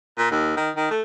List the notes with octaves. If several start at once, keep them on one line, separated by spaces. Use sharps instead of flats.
A#2
D#2
D#3
D#3
A3